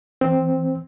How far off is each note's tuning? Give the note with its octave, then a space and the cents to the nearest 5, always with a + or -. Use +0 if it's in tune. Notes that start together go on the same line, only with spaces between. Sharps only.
E3 +0 C4 +0